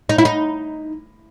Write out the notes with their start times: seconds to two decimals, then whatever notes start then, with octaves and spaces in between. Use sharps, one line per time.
0.09 D#4
0.18 E4
0.25 D#4